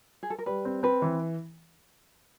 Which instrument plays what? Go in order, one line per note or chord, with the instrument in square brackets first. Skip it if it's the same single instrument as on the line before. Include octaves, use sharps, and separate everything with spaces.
[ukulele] G#4
A4
A#4
[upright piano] G3 [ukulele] B4
[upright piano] C4
[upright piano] C4 [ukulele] B4
[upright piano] E3